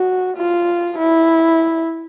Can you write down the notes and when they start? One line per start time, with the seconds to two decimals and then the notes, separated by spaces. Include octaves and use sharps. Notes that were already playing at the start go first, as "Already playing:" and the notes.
Already playing: F#4
0.37 F4
0.98 E4